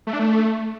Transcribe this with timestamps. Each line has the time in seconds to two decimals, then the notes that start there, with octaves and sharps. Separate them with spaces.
0.07 A3
0.13 D4
0.20 A3